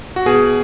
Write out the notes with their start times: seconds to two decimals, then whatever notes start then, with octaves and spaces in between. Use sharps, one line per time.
0.16 F#4
0.26 B2 G#4